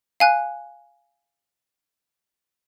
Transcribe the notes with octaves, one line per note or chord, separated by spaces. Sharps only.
F5 G#5 F#6